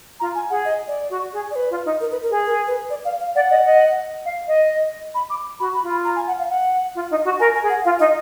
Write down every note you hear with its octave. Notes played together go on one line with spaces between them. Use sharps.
F4 A#5
G#5
G#4 F#5
D#5
D5
F#4
G#4
D5
B4
F4
D#4
A#4
B4
A#4
G#4
A#4
B4
D5
F5
F5
D5 F#5
D#5
D#5
F5
D#5
B5
D6
F#4 B5
B5
F4
B5
A#5
G#5
F#5
F5
F#5
F4
D#4
F#4
A#4 G#5
G#5
G#4
F#5
F4 F5
D#4 D#5